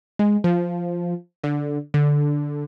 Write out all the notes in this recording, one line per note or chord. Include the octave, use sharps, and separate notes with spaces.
G#3
F3
D3
D3